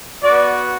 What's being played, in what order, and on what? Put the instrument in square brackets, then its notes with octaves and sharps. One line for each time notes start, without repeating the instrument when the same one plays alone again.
[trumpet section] B3 F#4 D5